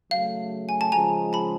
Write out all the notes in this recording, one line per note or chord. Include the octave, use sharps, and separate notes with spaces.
C#3 F#3 A3 F5
G#5
A5
C#3 F3 G#3 G#5 A#5
A5 B5